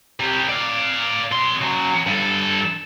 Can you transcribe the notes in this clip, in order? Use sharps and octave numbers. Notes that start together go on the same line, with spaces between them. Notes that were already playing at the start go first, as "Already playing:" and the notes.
C3 G3
D5 F5
B2 C6
C#3 F#3
G2 A4